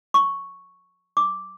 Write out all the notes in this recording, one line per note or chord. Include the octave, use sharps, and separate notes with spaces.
C#6
D6